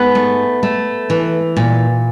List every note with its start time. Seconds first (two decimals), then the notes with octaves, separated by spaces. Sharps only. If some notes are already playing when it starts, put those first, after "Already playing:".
Already playing: G#2 B3
0.15 A3
0.63 A3
1.10 E3
1.57 A#2